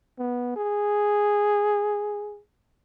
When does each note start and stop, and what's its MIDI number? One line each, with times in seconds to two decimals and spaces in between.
0.19 0.52 59
0.56 2.40 68